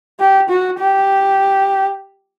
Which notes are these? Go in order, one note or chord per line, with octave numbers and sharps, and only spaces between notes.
G4
F#4
G4